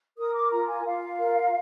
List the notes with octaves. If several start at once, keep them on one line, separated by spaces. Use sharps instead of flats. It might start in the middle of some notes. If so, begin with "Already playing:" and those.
A#4 D#6
D6
F4 A#5
G#5
F4 F5
A#4